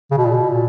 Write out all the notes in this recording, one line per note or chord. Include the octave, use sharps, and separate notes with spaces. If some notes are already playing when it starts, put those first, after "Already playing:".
C#3
B2
A#2
B2
A#2